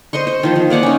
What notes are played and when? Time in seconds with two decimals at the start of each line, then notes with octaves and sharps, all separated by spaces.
0.13 C5 D#5 C6 C#6
0.27 C5
0.43 D#3 F3 C5
0.56 D#3
0.70 A#3 D5 F#5 G#5
0.83 C#4 D#4